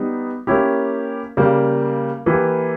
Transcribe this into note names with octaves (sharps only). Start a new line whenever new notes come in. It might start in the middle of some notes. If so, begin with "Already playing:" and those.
Already playing: G3 B3 D#4
A#3 C#4 E4 G4
C#3 G3 A#3
E3 A#3 E4 G4